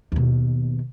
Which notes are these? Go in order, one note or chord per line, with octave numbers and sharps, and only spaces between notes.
D#2 B2